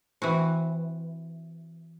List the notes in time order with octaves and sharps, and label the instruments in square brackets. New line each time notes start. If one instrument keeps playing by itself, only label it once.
[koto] E3 C4 F#4